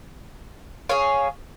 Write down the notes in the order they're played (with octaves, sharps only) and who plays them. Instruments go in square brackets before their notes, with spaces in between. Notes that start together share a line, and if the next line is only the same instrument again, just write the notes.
[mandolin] G#4 C#5 F5